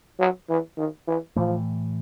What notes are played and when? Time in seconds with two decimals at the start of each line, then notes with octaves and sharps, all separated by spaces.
0.20 F#3
0.49 E3
0.77 D#3
1.08 E3
1.36 A2 E3 F3 A3